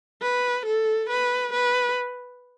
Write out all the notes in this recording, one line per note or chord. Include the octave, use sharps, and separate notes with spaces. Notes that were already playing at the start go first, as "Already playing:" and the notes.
B4
A4
B4
B4